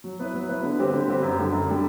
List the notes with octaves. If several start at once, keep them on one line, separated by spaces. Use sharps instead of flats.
F#3
B3 E4 B4
F#3
B3 E4 B4
D3
G3 C4 G4 B4
D3
G3 C4 G4 B4
F#2
D3 G3
F#2
D3 G3